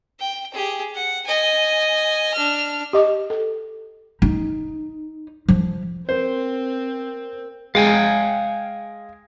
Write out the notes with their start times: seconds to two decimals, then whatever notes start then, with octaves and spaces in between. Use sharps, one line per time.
0.20 G5
0.54 G4 G#4
0.95 F#5
1.27 D#5 G#5
2.34 D4 F6
2.93 G4 D#5 D6
3.30 A4
4.22 D#4
5.48 F3
6.09 C4 A#4 C5
7.75 G#3 F5 G5 G#5